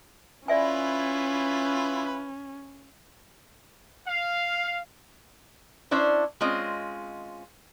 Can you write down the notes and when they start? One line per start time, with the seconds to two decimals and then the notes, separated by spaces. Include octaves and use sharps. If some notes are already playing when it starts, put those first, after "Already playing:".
0.48 C#4 E4 F4 B4 D5 E5 G#5
4.07 F5
5.91 C#4 D4 E4 C5
6.41 G#3 C4 C#4 F4 D#5